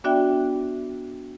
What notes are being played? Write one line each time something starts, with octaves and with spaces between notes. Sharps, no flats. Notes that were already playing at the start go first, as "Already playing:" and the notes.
B3 D4 F#4 D5 E5 G5